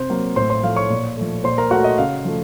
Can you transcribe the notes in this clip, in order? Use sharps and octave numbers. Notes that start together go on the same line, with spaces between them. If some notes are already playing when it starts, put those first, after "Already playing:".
Already playing: C3 C5 C6
F#3 A#3
A2 C5 C6
C5 C6
F3 A3 F5
C#5 C#6
A#2
F3 A3
A#2 C5 C6
A#4 A#5
A3 F#4 F#5
D#5
C#3 F5
F3 A3